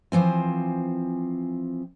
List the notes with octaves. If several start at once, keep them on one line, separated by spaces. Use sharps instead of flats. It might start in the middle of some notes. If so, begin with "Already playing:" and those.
E3 F3 C4 G#5